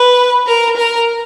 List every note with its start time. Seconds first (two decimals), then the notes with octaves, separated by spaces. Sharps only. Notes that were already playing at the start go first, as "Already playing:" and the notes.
Already playing: B4
0.46 A#4
0.77 A#4